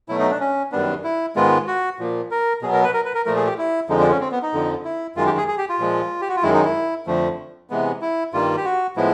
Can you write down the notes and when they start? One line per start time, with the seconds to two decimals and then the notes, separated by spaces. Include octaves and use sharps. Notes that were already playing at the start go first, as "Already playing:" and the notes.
0.09 B2 F#3 A3 E4
0.19 D#4
0.31 D4
0.40 C#4
0.72 F#2 D#3 G3 B3 D4
1.04 E4
1.36 G#2 D#3 G#3 B3 F4
1.67 F#4
1.99 A#2 F3 A#3
2.31 A#4
2.62 B2 F#3 B3 G#4
2.73 A#4
2.84 B4
2.94 A#4
3.05 B4
3.15 A#4
3.26 A#2 F3 A3 A#4
3.36 G#4
3.47 G4
3.58 E4
3.89 F2 D3 F3 G#3 D#4
4.00 D4
4.10 C#4
4.21 C4
4.31 B3
4.42 D#4
4.53 F2 D3 F3
4.85 E4
5.16 F#2 D#3 G#3 F4
5.26 G4
5.37 G#4
5.48 G#4
5.58 G4
5.69 F4
5.79 A#2 F3 G#3
6.21 G4
6.29 F#4
6.36 F4
6.43 F#2 D#3 G#3 E4
6.54 D#4
6.65 E4
7.07 F2 D3 F3 A3
7.70 C3 E3 G#3 B3
8.01 E4
8.33 G2 D#3 G3 A#3 F4
8.57 G4
8.65 F#4
8.96 A2 F3 G#3 B3 E4